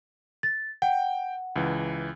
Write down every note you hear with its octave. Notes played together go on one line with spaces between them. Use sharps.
A6
F#5 G5
C#2 E3